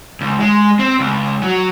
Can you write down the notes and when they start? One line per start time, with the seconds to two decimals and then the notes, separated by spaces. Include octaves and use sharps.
0.21 C#2
0.40 G#3
0.79 C4
0.99 C#2
1.43 F#3